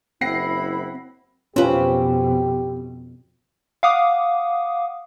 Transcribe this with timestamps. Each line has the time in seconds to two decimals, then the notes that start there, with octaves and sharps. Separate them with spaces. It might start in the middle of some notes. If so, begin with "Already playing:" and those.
0.21 F#1 C4 E4 F#5 B5 A#6 C7
1.56 F2 B2 C4 C#4 F4 G4 B4
3.83 F5 F#5 D6 D#6